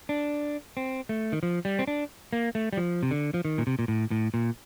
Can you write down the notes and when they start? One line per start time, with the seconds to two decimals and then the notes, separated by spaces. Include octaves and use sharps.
0.09 D4
0.77 C4
1.09 A3
1.32 D#3
1.43 F3
1.65 G3
1.79 C4
1.88 D4
2.33 A#3
2.55 A3
2.73 G3
2.77 F3
3.03 C3
3.11 D3
3.34 F3
3.45 D#3
3.58 A#2
3.67 C3
3.79 A#2
3.88 A2
4.11 A2
4.34 A#2